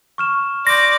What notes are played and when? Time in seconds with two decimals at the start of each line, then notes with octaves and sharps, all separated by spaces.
0.18 C#6 F6 E7
0.67 D5 C6 D6 G6 A#6